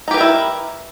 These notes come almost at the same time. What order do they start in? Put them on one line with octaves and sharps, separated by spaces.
D#4 G4 B4 A#4 E4